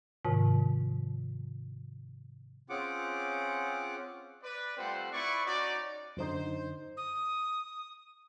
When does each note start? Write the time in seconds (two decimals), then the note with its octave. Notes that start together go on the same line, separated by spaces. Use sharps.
0.25 G#2 C3 D#3 F3
2.70 C4 C#4 F4 G#4 F#5 D6
4.42 B4 D5
4.77 G3 A3 C4 F4 C5 F#5
5.12 E4 B4 D5 C#6
5.46 C#4 D#4 F#4 D5
6.17 F#2 D3 D#4 C5
6.97 D#6